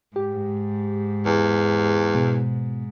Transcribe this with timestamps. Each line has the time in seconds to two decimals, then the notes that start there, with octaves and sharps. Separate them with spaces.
0.16 G#2 G4
1.25 E2
2.15 B2